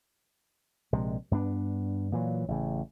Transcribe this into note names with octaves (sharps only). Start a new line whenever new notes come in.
A#1 C3 G#3
G2 B3 D4
A#2 E3 F#3
A1 C#3